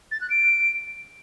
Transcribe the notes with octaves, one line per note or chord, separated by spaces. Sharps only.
A6
F#6
D7